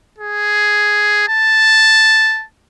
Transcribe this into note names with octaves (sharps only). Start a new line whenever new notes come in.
G#4
A5